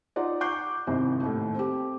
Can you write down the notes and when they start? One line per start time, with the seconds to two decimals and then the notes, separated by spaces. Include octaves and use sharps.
0.16 D#4 F4 D5 F#5
0.41 C#6 D6 F#6 G6 C7
0.87 G#1 C3 E4
1.22 D#2 A2
1.55 C4 G4